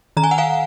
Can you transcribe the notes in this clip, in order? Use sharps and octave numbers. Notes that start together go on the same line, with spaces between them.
D#3 A#5
G#5
F#5
F5 G#5